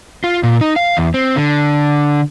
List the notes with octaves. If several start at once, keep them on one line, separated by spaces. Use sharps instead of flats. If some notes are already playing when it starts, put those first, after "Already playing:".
F4
A#2
D#4
F5
E2
C4
D3